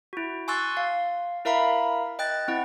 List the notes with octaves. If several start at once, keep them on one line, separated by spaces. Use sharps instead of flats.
E4 F#4
G#5 C6 C#6 E6 F#6 A6
F5
E4 A#4 E5 F5 A#5 B5
D#5 G5 F#6 A6
C4 E4 F#5